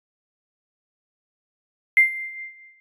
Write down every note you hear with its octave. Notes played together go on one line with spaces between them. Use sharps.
C7